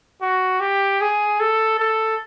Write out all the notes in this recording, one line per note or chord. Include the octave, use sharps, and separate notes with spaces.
F#4
G4
G#4
A4
A4